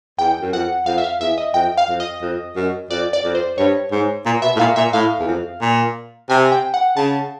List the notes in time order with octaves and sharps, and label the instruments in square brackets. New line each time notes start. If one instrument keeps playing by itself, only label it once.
[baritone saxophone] E2 [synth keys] G5
[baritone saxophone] F#2
[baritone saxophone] F2 [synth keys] F#5
[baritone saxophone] F2 [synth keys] F5
[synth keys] E5
F5
[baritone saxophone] E2 [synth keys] E5
[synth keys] D#5
[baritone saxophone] F2 [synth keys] G5
[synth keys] F5
[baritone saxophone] F2
[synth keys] D#5
[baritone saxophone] F2
F#2
[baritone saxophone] F2 [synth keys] D5
[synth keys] D5
[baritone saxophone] F2
[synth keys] C5
[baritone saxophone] G2 [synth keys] C#5
[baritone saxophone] G#2
A#2
[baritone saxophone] B2 [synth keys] E5
[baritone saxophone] A2
[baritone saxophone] A#2 [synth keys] F5
[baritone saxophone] A#2 [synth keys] E5
[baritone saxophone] A2 [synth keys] F5
[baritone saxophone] E2
F2
A#2
[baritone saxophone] C3 [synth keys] G#5
[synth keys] G5
F#5
[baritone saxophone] C#3 [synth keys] A5